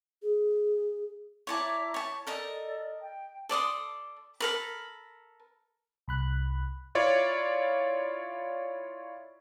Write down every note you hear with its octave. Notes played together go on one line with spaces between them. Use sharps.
G#4
E4 C#5 D5 A5 A#5 D6
C#5 A5
A4 A#4 D5 D#5 A5
G5
A4 D5 C6 D#6
A4 A#4 B5
C2 B5 F#6
E4 F4 C#5 D5